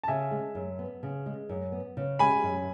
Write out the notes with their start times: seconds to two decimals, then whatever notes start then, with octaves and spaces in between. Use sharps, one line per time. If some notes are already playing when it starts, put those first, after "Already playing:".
0.03 A5
0.08 C#3 E5 G#5
0.31 G#3
0.55 F#2
0.79 B3
1.03 C#3
1.26 G#3
1.49 F#2
1.72 B3
1.97 C#3
2.19 G#3 G#5 B5
2.43 F#2